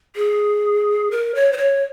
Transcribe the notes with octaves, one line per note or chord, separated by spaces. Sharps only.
G#4
A#4
C#5
C5
C#5